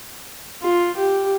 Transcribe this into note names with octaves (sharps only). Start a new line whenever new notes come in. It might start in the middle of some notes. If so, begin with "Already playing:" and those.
F4
G4